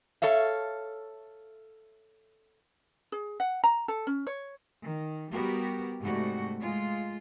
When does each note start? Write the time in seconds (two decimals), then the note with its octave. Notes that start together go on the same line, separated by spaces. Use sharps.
0.22 A4 C#5 E5 F5
3.12 G#4
3.40 F#5
3.64 A#5
3.88 A4
4.07 C#4
4.27 C#5
4.82 D#3
5.31 G3 B3 F#4 G4 A#4
6.01 G#2 C3 G3 A3 F#4
6.60 G#3 F4